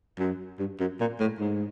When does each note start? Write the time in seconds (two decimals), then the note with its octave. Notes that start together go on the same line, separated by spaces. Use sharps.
0.19 F#2
0.59 G2
0.80 F#2
1.00 A#2
1.20 A2
1.40 G#2